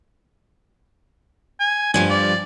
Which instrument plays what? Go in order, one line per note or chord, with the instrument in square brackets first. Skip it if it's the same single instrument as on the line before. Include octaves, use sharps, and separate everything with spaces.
[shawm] G#5
[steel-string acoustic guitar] G2 F3 G4 [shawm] G#5
[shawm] D5